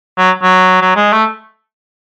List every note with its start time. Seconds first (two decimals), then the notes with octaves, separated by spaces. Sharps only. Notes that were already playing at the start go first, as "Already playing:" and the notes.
0.18 F#3
0.43 F#3
0.81 F#3
0.97 G#3
1.13 A3